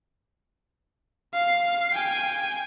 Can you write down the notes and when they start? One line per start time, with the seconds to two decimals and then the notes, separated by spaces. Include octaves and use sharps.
1.34 F5
1.94 G5 G#5